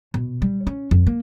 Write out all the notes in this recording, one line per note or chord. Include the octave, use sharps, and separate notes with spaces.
B2
G3
C#4
F2
A#3